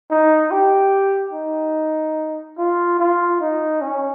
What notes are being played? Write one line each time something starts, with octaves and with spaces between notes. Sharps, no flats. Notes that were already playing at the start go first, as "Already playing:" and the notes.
D#4
G4
D#4
F4
F4
D#4
C#4